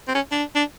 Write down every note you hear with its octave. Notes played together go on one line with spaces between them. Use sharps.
C4
C#4
D4
D4